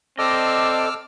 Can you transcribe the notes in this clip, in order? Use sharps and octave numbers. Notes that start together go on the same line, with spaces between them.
C4 A4 D5 D#5 D6 E6 F6